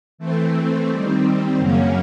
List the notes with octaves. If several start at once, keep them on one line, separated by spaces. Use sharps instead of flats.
E3 A3 C4
D#3 G3 C4
F#2 C#3 F#3 A#3 C#4